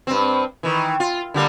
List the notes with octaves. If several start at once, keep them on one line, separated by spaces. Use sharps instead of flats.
G2 C4
D#3 E3
F4
D3 G3 A#3